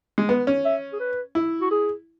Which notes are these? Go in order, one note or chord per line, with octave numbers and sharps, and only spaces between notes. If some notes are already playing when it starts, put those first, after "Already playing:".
G#3
B3
C#4
E5
G#4
B4
E4
F#4
G#4